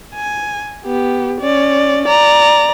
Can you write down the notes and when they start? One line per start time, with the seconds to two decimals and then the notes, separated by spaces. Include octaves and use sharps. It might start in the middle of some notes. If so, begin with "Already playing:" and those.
0.15 G#5
0.86 B3 G4
1.41 C#4 D5
2.06 D5 A#5